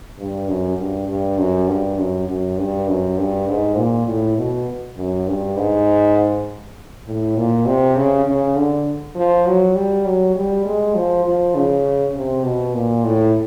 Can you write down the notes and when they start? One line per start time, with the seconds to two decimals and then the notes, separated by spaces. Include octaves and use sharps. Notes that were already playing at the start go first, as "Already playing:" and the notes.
0.18 G2
0.48 F#2
0.79 G2
1.08 G2
1.38 F#2
1.68 G2
1.98 F#2
2.28 F#2
2.57 G2
2.88 F#2
3.17 G2
3.48 G#2
3.77 A#2
4.07 A2
4.38 B2
4.97 F#2
5.27 G2
5.57 G#2
7.06 A2
7.37 A#2
7.66 C3
7.96 C#3
8.26 C#3
8.56 D3
9.15 F3
9.46 F#3
9.75 G3
10.06 F#3
10.35 G3
10.65 G#3
10.95 F3
11.25 F3
11.55 C#3
12.15 C3
12.45 B2
12.74 A#2
13.04 A2